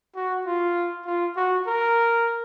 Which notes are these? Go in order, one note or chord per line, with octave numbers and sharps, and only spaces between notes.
F#4
F4
F4
F#4
A#4